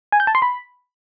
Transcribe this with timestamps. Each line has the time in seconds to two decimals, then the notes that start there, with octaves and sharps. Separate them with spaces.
0.12 G#5
0.20 G6
0.27 A5
0.35 C6
0.42 B5